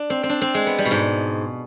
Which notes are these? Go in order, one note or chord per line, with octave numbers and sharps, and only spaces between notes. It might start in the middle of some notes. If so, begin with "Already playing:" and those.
Already playing: D4
C4
C4
D4
C4
G#3
B3
G3
B2
G#2